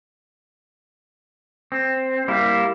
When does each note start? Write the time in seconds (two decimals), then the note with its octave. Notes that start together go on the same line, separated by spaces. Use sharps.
1.72 C4
2.28 G3 A#3 E4